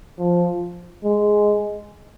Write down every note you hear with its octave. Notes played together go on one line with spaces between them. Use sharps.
F3
G#3